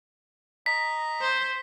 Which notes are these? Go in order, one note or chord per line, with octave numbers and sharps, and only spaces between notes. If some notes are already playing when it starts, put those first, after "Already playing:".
D#5 A#5 B6
C5